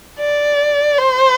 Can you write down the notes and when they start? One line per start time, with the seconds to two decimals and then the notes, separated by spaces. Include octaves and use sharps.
0.19 D5
0.97 C5